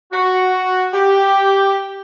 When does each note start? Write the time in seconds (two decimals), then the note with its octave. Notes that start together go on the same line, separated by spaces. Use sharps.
0.12 F#4
0.94 G4